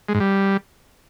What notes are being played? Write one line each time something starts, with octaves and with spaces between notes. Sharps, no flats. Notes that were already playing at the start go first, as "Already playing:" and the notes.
G#3
G#2
G3